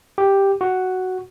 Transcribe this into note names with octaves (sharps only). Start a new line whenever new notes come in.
G4
F#4